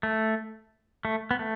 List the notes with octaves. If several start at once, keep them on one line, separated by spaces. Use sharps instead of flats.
A3
A3
B3
A3